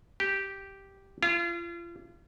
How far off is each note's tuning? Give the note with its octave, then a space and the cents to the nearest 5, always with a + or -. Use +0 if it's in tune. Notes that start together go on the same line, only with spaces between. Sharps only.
G4 -5
F4 -35